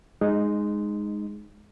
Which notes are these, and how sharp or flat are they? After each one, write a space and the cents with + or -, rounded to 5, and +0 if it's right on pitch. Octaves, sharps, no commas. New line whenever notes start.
G#3 +0 D#4 -15